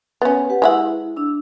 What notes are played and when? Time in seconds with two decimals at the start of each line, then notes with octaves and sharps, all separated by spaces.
0.22 B3 C#4
0.49 G4 B4 F#5
0.62 G#3 E4 E5 F#5
1.16 D4 E6